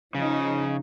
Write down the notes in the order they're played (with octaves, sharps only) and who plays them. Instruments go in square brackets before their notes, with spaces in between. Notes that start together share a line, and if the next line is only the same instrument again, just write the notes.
[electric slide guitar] C#3 [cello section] F3 D#4